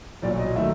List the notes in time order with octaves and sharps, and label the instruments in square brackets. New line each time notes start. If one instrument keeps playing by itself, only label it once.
[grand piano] B1 A#2 F#3 D5
D#5
D#3 F#3 A3 E5